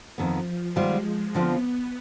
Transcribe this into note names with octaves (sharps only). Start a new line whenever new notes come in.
F2 D#3 F3 B3
D#3 G3 G#3 B3 F4 C5
D3 F3 B3 C4 F4